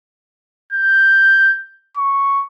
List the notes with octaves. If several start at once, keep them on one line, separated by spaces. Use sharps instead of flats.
G6
C#6